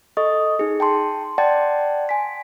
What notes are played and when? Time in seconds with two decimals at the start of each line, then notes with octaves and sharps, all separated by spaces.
0.17 A4 D#5 C#6 D#6
0.59 D#4 G#4
0.80 G5 A5 C6
1.38 D5 F#5 G5 A5 C6 A6
2.09 G#5 B6